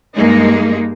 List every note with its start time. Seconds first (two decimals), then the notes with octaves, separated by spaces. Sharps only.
0.15 G2 G#3 A#3 D#4